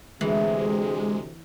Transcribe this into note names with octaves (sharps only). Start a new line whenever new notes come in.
D2 C3 E3 G#3 G#4